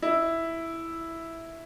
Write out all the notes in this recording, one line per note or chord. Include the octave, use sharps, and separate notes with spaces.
E4